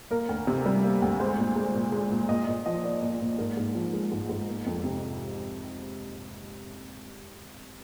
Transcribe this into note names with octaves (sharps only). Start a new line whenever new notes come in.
A#3 A#4
D2
C3
G3
A#3
D2
G#3 C5
A#2
G#3
A#2
G#3
A#2
A#2 D#5
A#2 D#5
F3 D#5
A#3 D5
A#2
A#2
G#2 A#4
G#2
F3
G#3
G#2
G#2
A#3
F2
C3